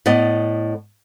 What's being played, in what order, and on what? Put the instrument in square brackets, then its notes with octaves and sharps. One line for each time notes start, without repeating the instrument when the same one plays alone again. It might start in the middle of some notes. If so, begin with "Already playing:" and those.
[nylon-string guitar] A2 B3 D5 D#5